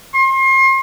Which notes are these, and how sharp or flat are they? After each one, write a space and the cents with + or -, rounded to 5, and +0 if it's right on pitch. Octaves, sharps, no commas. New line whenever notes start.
C6 +35